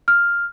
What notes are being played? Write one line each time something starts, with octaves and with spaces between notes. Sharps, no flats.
F6